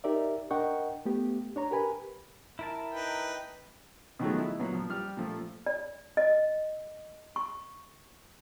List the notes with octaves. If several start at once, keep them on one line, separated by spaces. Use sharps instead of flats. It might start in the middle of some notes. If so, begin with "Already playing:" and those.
D#4 G4 A#4 D5 E5
D4 A#4 D#5 F#5 G5 C#6
A3 B3 G4
D4 C#5 A#5
G4 A#4 B4 G#5 B5
E4 A#4 A5
D#4 B4 G5
B2 D#3 F3 F#3 G#3 A3
E4
A#2 F#3 B3
F3
G3 F6
A#2 F3 A3
D5
D#5
C#6